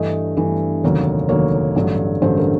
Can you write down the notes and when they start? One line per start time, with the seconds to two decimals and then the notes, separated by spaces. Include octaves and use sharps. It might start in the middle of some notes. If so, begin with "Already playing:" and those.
Already playing: G2 E3 A3 D#5
0.37 G2 E3 A3
0.83 F1 D#2 D3 F#3 A#3
1.29 F1 D#2 D3 F#3 A#3 C#5
1.75 A1 G2 D3 F#3 A3
2.22 A1 G2 D3 F#3 A3 C5
2.37 A#4